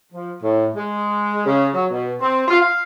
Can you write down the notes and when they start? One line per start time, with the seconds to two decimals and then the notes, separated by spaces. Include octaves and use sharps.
0.11 F3
0.42 A2
0.76 G#3
1.46 C#3
1.74 F#3
1.90 B2
2.21 C4
2.48 F4
2.61 F5